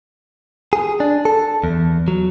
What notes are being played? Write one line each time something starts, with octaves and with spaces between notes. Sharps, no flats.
G#4
D4
A4
E2
F#3